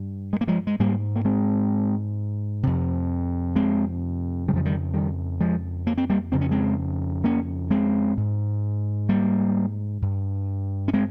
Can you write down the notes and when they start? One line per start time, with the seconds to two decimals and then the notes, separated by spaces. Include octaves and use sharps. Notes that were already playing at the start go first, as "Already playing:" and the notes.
Already playing: G2
0.33 G#3
0.41 A#3
0.48 F3 G#3
0.67 G#3
0.79 G#2 G3 A#3
1.16 A#3
1.25 G#3 C4
2.63 F2 C3
3.56 G#3 C4
4.48 C#3 G3
4.53 F2 F3
4.65 D#3 G3
4.94 D#3 G3
5.41 F3 G#3
5.87 A#3
5.98 C4
6.10 G3 A#3
6.32 F2 C#3 C4
6.41 C#4
6.51 G#3 C4
7.24 A#3 C#4
7.71 G#3 C4
8.17 G#2
9.09 G3 A#3
10.02 G2
10.88 C#4
10.94 G#3 C4